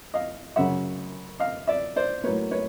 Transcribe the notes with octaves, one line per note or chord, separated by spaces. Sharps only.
D#5 F5
F#2 C#3 F#3 E5 F#5
D#5 F5
D5 E5
C5 D5
A2 F#3 A#3 B4 C#5
B4 C#5